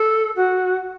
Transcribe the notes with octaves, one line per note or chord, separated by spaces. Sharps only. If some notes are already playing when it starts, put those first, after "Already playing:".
Already playing: A4
F#4